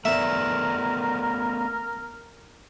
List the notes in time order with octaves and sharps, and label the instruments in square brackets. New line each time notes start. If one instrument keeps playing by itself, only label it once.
[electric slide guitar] A3 B3 D5 [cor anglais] A#4 [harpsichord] E5